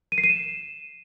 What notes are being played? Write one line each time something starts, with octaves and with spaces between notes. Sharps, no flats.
D#7
C7
D#7
E7